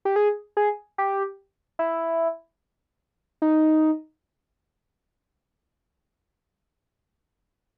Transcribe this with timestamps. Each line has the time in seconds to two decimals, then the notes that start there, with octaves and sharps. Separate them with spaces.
0.05 G4
0.16 G#4
0.57 G#4
0.98 G4
1.79 E4
3.42 D#4